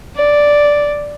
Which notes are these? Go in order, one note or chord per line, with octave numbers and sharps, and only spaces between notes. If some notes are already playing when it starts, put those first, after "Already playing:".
D5